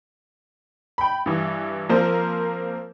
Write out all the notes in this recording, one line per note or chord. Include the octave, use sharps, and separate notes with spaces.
G5 B5
G2 E3
F3 A#3 C4 A#4 C5